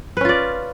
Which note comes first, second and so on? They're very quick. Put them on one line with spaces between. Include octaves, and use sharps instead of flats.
B4 C#4 F4 D5